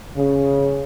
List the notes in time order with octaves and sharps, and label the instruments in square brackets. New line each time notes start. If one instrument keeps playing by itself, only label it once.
[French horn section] C#3